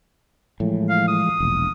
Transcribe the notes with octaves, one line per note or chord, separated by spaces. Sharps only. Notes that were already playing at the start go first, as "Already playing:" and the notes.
A2 E3 F3 G#3
F5
D#6
E1 A#1